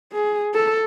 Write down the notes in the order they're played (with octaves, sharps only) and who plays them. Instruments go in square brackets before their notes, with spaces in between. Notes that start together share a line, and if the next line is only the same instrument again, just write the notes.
[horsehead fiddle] G#4
A4